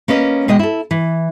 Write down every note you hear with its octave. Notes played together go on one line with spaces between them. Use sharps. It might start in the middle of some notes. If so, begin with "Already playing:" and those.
A#3 C#4 B4 D#5
B2 G#3 D#5 G5
E4 A4
E3